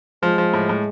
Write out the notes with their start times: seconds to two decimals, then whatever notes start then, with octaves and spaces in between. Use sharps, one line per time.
0.23 F3 G#3
0.38 F3
0.54 A2
0.69 A2